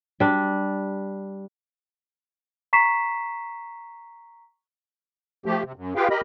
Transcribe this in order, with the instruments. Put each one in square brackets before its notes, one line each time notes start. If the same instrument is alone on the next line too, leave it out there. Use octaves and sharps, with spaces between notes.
[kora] G3 D4
[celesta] A#5 C#6 B6 C7 E7
[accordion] F3 A3 G4
C3
F#2
F4 G4 G#4 B4 F5 G5
G4 A#4 D#5 B5